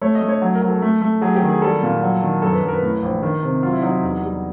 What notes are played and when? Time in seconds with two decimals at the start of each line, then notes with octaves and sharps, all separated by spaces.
0.01 A3 C#5
0.15 D#5
0.21 A3
0.29 C#5
0.42 F#3
0.55 A#4
0.62 F#3
0.69 A4
0.82 A3
1.01 A3
1.21 F#3 G#4
1.35 G4
1.42 D#3
1.49 G#4
1.62 G3 A4
1.83 A#2
2.03 F#3
2.22 D#3
2.42 F#2 A4
2.52 B4
2.63 F#2
2.68 A#4
2.73 B4
2.82 A2
3.02 A#1
3.23 D#3
3.43 C3
3.62 F#3 F4
3.73 E4
3.83 F#3 D#4
3.93 E4
4.03 E2 D#4
4.23 G3